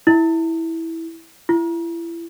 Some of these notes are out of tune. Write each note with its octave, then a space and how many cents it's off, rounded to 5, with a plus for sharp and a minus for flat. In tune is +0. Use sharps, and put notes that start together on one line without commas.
E4 -10
E4 +30